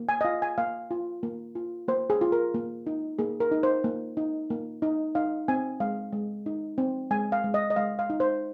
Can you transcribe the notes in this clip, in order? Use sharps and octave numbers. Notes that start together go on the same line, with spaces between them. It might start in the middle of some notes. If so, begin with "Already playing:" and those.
Already playing: A#3
G#5
D#5
F4 F5
G#5
A#3 F5
F4
A#3
F4
A#3 C5
G#4
F4
A#4
A#3
D#4
A#3 G#4
A#4
D#4
C5
A#3
D#4
A#3
D#4
D#4 F5
C4 G#5
G#3 F5
G#3
D#4
C4
G#3 G#5
F5
G#3
D#5
D#5
G#3 F5
F5
D#4
C5